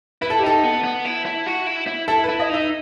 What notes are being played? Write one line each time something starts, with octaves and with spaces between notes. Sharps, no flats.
E4 B4
A4
G4
D#4 A4
B3
B3
E4
E4
F#4
E4
E4
E4 A4
E4 B4
D#5
D#4 E5